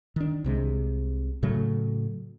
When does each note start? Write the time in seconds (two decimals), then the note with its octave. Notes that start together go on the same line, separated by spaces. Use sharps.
0.16 D#3 D4
0.44 C2 C3 G#3
1.42 A2 C#3 F#3 A3